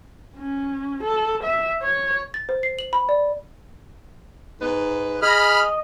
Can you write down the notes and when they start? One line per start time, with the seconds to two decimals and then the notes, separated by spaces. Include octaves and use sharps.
0.37 C#4
1.03 A4
1.43 E5
1.82 C#5
2.34 A6
2.49 C5
2.63 C7
2.79 F#7
2.93 B5
3.09 D5
4.61 G#2 D#4 B4
5.22 G#4 D#5 B5 F6